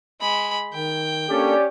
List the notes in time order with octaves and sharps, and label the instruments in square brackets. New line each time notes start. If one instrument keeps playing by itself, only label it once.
[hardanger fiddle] G#3 B5
[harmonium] D#3 [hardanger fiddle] G5
[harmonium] A#3 D4 A4 [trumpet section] C#4 G4 [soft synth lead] D5